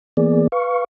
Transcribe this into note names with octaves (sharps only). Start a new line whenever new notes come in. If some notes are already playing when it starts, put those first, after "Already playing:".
E3 A#3 B3 G#4 D5
B4 F5 C#6